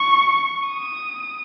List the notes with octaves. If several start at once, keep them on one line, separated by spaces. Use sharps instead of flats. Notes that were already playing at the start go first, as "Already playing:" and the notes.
Already playing: C#6
D#6